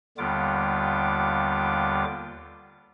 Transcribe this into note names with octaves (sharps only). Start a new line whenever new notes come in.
D#2 D3 G3 B3 F4 D6